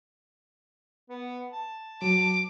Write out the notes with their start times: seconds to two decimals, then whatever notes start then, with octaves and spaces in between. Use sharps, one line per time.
1.10 B3
1.52 A5
2.02 F#3 D6